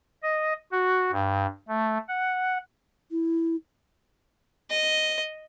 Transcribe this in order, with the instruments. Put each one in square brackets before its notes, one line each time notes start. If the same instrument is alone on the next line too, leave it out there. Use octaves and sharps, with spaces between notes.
[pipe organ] D#5
F#4
G2
A3
F#5
[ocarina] E4
[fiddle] D#5